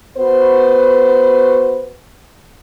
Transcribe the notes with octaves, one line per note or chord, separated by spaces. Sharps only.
B3 F#4 B4 C5